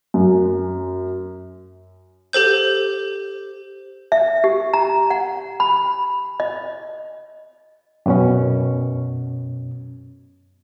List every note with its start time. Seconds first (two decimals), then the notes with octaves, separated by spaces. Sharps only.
0.14 F#2
2.33 G4 A4 C5 G6
4.12 E5
4.44 G4
4.73 A#5
5.10 F#5
5.60 B5
6.40 D#5
8.06 F#2 B2 C#4